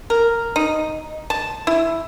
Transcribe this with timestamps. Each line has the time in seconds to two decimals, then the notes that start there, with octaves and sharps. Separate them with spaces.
0.10 A#4
0.56 D#4
1.30 A5
1.67 E4